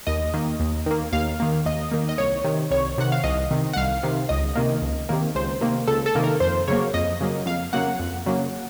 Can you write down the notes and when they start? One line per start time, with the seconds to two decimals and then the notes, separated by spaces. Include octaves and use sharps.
0.07 D#2 D#5
0.34 D#3 A#3
0.60 D#2
0.86 D#3 A#3
1.12 D#2 F5
1.40 D#3 A#3
1.66 D#2 D#5
1.91 D#3 A#3
2.09 D#5
2.18 C2 C#5
2.44 C3 D#3
2.71 C2 C#5
2.98 C3 D#3 F#5
3.12 F5
3.24 C2 D#5
3.51 C3 D#3
3.73 F#5
3.76 C2 F5
4.03 C3 D#3
4.29 C#2 D#5
4.55 C3 D#3 A#3
4.82 C#2
5.09 C3 D#3 A#3
5.35 C#2 C5
5.61 C3 D#3 A#3
5.87 C#2 A4
6.06 A4
6.15 C3 D#3 A#3
6.24 A#4
6.40 F2 C5
6.68 C#3 F#3 A#3 C#5
6.94 F2 D#5
7.21 C#3 F#3 A#3
7.46 F2 F5
7.73 C#3 F#3 A#3 F#5
7.99 F2
8.26 C#3 F#3 A#3